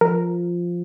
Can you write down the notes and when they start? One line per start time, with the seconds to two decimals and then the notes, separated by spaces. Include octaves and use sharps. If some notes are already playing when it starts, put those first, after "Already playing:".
0.01 F3 A#4